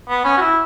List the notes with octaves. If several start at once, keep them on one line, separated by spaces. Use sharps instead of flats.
B3
C#4
F#4
E4